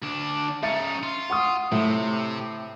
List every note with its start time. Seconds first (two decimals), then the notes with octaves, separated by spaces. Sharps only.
0.03 D2 D4
0.63 C#3 D#4 E5 A6 C#7
1.03 F4
1.30 F#5 C#6 D#6
1.72 A2 C3